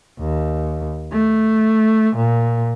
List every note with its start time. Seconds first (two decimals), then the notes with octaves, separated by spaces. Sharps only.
0.19 D#2
1.12 A3
2.16 A#2